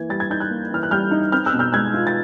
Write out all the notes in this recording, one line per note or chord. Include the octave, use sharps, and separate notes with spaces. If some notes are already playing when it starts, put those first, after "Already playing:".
Already playing: E3 A#3 G#6
G3 A6
G#6
D#4 G6
F#6 G#6
A#3
E3 F6
F#6
G3 F6 G6
D#4
C4 F6 G6
E6 F#6
B2
F6 G6
G#3 F#6 G#6
F4
A6